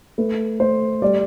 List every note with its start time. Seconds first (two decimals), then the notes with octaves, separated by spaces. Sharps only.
0.18 A3 B4
0.60 A3 C5
1.02 G3 D5